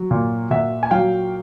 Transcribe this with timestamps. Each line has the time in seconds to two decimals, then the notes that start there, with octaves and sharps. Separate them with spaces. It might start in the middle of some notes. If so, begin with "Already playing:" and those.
Already playing: F#3
0.11 A#2
0.51 A#2 E5 F#5
0.83 G#5
0.91 F#3 F5 G5